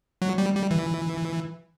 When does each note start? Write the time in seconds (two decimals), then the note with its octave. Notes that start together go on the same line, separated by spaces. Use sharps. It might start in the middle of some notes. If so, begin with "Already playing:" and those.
0.22 F#3
0.38 G3
0.55 G3
0.71 E3